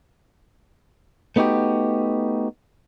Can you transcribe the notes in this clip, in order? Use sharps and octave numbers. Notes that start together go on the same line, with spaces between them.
A3 B3 D#4 F#4 G4